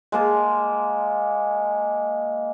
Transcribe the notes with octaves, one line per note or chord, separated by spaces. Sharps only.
G#3 A#3 A5